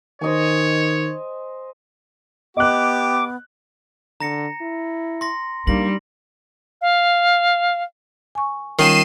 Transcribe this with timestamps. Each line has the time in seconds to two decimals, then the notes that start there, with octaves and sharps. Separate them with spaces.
0.21 D#3 C5 C#5 D#5 G#5
2.57 B3 G4 D#5 D6 F#6
4.20 D3 A#5 A#6 C#7
4.61 E4
5.21 C6 A#6
5.67 G3 A#3 D4 D#4 A#6 F#7
6.81 F5
8.35 G#5 C#6
8.79 D#3 G3 C#4 F4 A#4 C7 D#7 E7